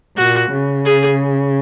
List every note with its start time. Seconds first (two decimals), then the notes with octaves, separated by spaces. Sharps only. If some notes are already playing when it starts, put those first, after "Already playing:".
0.17 A#2 F#4
0.52 C#3
0.85 G#4